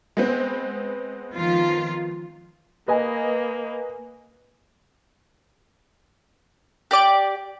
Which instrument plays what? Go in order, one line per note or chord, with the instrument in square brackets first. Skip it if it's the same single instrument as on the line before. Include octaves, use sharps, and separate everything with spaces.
[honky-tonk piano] G#3 B3 C4
[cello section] D#3 F3 F4
[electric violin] A#3 [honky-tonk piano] B4 D#5 G#5
[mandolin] G4 D5 D6